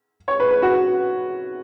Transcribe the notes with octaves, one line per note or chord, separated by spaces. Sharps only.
C#5
B4
B4
F#4